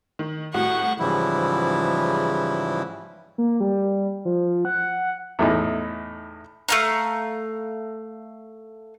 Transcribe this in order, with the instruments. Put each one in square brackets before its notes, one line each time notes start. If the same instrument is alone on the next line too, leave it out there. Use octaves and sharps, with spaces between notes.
[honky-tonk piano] D#3
[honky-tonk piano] C2 A2 F#4 [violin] F#5 C#6
[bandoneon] G#2 C#3 E3 F3 G3 E4
[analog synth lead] A#3
G3
F3
F#5
[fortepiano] E2 A2 D#4
[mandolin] A3 F5 A#5